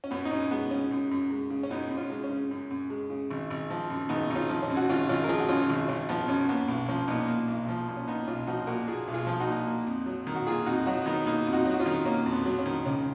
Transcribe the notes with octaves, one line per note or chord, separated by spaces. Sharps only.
C#4
F#2 B3
D#4
F#2 C#4
G#3 B3
C#3 C#4
F#2
F#2
G#3
C#3
C#4
F#2 B3 D#4
F#2
C#4 F4
G#3
C#4
C#3
F#2
F#2
G#3
C#3
G#1
G#1
F3
F#2
G#1 B3 D#4
G#1 D#4
C#4 F4
F3
C#4
F#2
F#4
G#1 C#4 F4
G#1 C#4 F4
A#4
F3 F4 G#4
F#4
F#2 C#4 F4
G#1
G#1 C#4
F3 B3
F#2 C#4
A#3 B3
B1 B3
F3 C#4
A#2 B3 D#4
A#3
B1
F3
A#2
C#4
A#3 B3 D#4
B1 C#4 F4
F3 D#4 F#4
A#2 F#4 A#4
A#3 F4 G#4
B1
F4 G#4
F3
D#4 F#4
A#2
A#3
F2
F#3
D#3
F#4
A#3 F4 G#4
F2 D#4 F#4
F#3 D#4 F#4
D#3 B3 D#4
A#3 B3 D#4
F2
D#4 F#4
F#3
F#4
C#4 F4
D#3
A#3 C#4
F2
B3
F#3
C#4
D#3
C#2 C#4